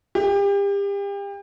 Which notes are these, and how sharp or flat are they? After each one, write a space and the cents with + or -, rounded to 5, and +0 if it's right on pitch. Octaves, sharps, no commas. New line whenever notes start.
G4 +35